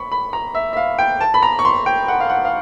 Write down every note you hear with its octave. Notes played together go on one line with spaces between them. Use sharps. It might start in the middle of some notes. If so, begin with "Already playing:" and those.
Already playing: B5 C#6
B5
A#5
E5
E5
F5
G5
A5
B5
A#5
C#6
C6
G5
F#5
F5
F#5
F5